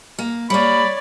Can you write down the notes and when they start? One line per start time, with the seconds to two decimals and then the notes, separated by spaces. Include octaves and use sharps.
0.19 A#3
0.50 G3 A#3 C#5 D5 B5